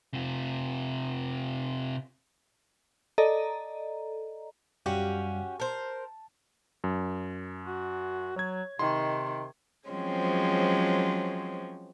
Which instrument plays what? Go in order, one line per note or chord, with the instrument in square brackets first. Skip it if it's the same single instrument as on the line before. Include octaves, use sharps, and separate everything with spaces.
[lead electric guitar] C3 F4
[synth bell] A4 D5 D#5 A#5
[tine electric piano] F#2 G3 F5 [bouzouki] C#4 F#4 G4
[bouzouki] A#4 C5 [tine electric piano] A5
[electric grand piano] F#2
[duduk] F#4
[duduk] F#3 [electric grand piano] C#5 G#6
[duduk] C3 [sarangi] D#3 [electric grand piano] C6
[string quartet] F3 F#3 G#3 C4 C#4